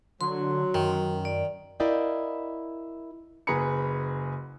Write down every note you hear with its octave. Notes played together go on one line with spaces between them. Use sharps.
D3 F#3 C6
F#2 D#3
D5
E4 A#4 D5 D#5 F5 G5
F#1 G#4 B4 A#5 B5 C#7